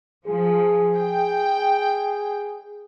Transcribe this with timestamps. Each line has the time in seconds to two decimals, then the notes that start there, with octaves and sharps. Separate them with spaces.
0.27 F3 G#4
0.98 G5